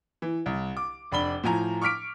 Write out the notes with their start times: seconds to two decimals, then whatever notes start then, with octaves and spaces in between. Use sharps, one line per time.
0.22 E3
0.46 C2
0.77 D6
1.12 F1 D4 B5 G7
1.43 A2 F3 G#5 A#5
1.82 C#6 D6 F6 B6 D7